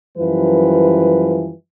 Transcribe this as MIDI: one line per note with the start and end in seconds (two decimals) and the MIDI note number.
0.17 1.50 42
0.17 1.50 52
0.17 1.50 53
0.17 1.50 55
0.17 1.50 71